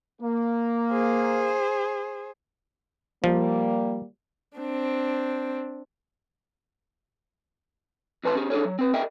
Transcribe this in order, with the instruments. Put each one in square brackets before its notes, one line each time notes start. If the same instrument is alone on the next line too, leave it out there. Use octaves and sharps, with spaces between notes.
[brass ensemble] A#3
[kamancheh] G#4 C5
[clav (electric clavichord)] F3 [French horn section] G3 A#3
[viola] C4 D4
[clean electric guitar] F2 E3 B4 A5 C6
C#4 G4 G#4
D4 G#4 A4 C#5
F#3
C4 B4
G#4 A#4 D#5 E5 G5